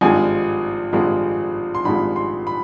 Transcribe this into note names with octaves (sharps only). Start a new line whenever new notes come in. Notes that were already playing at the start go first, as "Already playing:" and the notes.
G#1 G2 F3 G#3 G#5
G#1 G2 F3 G#3
C6
G#1 G2 F3 G#3 B5
C6
B5